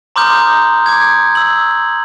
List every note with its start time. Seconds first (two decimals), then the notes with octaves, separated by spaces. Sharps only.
0.16 A#5 C6 D6 D#6 F6 G6
0.86 D6 G#6
1.35 E6 F#7